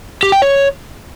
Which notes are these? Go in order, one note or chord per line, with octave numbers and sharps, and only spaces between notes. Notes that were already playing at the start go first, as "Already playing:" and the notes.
G4
G5
C#5